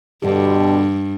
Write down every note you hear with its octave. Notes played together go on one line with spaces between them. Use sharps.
G2 B2 D3 G4